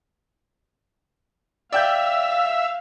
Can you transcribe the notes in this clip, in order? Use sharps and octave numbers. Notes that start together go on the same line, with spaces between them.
D5 E5 F5 G5 G6